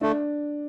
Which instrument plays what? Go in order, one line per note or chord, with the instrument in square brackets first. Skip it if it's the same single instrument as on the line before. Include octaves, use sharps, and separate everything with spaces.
[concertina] A3 [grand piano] D4